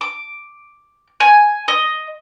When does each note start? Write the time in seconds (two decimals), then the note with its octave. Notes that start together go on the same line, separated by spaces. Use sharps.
0.01 D6
1.20 G#5
1.68 D#5